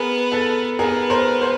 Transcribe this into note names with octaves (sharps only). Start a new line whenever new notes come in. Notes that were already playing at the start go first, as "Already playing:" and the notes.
Already playing: B3 G#4 A#4
A4 B4
B3 G#4 A#4
A#4 C5
A#4 C5